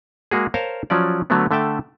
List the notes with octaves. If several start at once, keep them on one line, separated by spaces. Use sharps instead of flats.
G#3 A#3 F#4 G#4
A#4 C5 C#5 F5 A5 A#5
F3 F#3 C#4 D5
D3 F#3 A3 B3
D3 A3 E5 G5 A5